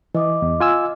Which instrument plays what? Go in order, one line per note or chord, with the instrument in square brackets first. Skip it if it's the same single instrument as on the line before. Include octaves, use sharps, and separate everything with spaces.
[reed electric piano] E3 [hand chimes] D#5 D6 D#6
[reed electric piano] E2
F4 G#5 E6